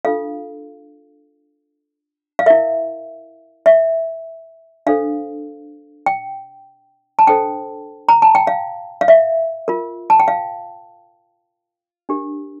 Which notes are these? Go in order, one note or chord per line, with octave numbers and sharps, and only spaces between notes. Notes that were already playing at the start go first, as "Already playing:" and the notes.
D4 F4 A4 F5
F5
E4 A#4 E5
E5
D4 A4 C5 F5
G5
A5
D4 A4 C5 G5
A#5
A5
G5
F5
F5
E5
F4 A#4
A5
G5
F5
D4 G4 A#4